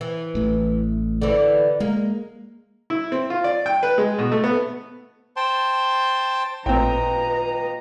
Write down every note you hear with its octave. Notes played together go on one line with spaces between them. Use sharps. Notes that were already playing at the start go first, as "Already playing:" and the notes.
E3
A1 A2
D3 E3
G#3 A#3
E4
C4
F4
D5
G5
B4
G#3
B2
A3
B3
C5 G5 A5 C6
A1 A#2 C4 B4 D#5 G5 A#5